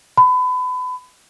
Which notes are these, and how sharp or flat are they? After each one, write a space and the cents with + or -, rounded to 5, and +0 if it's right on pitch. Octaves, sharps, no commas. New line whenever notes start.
B5 +30